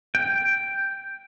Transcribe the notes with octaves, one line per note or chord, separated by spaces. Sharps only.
G5